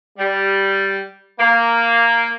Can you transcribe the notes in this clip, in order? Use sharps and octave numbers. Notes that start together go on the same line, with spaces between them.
G3
A#3